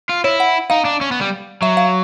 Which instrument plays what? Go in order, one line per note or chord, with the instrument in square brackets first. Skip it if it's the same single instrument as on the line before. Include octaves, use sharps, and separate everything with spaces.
[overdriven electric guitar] F4
[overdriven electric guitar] E4 [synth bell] C#5
[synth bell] F#5
[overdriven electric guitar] D#4 [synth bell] F5
[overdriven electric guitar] D4
C#4
B3
G3
[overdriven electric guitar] F#3 [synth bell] E5
[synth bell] F5